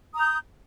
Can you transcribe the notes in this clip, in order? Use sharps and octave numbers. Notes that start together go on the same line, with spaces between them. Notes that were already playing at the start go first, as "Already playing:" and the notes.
A#5 D#6 G6